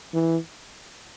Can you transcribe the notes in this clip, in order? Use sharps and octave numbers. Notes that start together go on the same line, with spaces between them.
E3